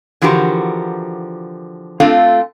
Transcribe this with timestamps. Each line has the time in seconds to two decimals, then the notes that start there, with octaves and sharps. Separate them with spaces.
0.22 D3 E3 F3 F#4 G4 A#4
2.00 A3 C4 D4 F4 A4 F5